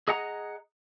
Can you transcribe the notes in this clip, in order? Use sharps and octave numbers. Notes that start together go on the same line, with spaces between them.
G#4 D#5 F#5 A#5